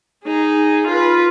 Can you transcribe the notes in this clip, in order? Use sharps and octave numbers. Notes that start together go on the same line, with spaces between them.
D#4 G#4
F4 B4